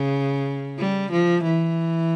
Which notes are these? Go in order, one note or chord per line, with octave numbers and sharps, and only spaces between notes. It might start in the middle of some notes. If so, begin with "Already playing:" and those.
Already playing: C#3
G3
F3
E3